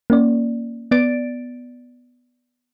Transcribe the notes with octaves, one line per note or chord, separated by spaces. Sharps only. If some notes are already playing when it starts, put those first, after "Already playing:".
A#3 C#4 D5
B3 D5 A6 D7